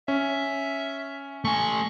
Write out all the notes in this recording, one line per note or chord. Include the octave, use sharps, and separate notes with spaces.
C#4 E5
A3 G#5 C#6